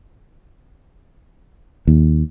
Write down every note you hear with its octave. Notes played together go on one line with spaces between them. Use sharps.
D#2